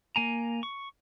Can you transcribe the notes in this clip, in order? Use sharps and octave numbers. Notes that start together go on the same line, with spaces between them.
A#3 G#5 A#5
C#6